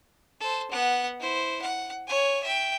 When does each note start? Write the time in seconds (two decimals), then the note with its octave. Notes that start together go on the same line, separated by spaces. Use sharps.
0.40 A4 C5
0.71 B3 F#5
1.20 E4 C5
1.62 F#5
2.07 C#5 G#5
2.43 E5 G5